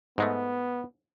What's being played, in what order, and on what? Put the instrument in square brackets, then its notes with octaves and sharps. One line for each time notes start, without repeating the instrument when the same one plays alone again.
[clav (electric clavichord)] G#2 G#3 A3 [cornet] B3